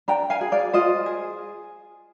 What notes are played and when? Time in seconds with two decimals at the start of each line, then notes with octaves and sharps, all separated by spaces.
0.08 D4 G5 A#5
0.30 F5 G#5
0.41 G#4
0.52 D5 F5
0.73 F4 C5 D#5
1.06 G#4